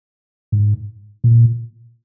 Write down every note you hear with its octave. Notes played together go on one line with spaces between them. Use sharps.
G#2
A#2